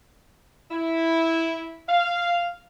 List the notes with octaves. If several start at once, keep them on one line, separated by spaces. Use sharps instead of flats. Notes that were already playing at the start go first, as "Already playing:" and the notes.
E4
F5